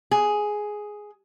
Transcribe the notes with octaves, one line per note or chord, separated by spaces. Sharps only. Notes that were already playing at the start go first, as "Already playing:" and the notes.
G#4